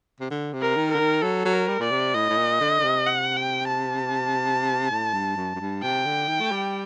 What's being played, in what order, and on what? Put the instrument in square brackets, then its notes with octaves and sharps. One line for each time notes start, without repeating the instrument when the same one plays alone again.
[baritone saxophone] C3
D3
C3
[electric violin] A#4
[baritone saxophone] D#3
[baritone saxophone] D3 [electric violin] A#4
[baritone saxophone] D#3
[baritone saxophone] F#3 [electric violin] A4
[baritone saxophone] F#3
[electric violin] A#4
[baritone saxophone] G3
[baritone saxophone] A#2 [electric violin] D5
[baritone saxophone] C3
[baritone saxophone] A2 [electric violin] D#5
[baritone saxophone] A2
A#2
D3
D3
C3
[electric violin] F#5
G5
A5
[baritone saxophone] A2
G2
F#2
F#2
G2
[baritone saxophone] C3 [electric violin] G5
[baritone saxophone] D3
D#3
A3
G3